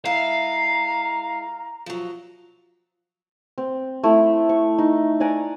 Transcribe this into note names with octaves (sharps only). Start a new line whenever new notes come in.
G#3 E4 F5 A#5
F3 F#3
C4
A3 E4
C#6
D#4
D5 F#5 G#5 A#5